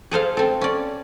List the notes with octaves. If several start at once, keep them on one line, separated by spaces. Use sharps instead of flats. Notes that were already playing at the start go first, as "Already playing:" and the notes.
G#4 A4 C5 F5
C4 A4
C#4 D5